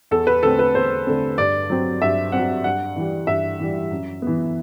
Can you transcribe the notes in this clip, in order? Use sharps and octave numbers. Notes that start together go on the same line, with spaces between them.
E2 A4
B4
D3 A3 C4 A4
B4
E2 C5
D3 A3 C4
G2 D5
F#3 C4
G2 E5
F#3 C4 F#5
G2 F#5
E3 G3
G2 E5
E3 G3
F#2
E3 B3